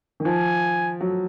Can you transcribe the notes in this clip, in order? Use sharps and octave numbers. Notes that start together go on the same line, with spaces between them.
D#3
F3 G#5
F#3